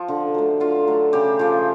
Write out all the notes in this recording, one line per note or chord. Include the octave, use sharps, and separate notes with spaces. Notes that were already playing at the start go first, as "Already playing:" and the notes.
Already playing: F3
D3
F#3 A3
D3 F4
F#3 A3
C#3 G4
F3 A3